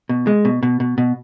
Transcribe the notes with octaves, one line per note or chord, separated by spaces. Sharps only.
B2
G#3
B2
B2
B2
B2